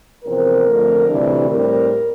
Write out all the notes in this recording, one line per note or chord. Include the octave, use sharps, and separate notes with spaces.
E2 C3 F3 C4 A#4
F2 D3 A3
D2 C3 E3 G3 D4
A2 G3 C4 A#4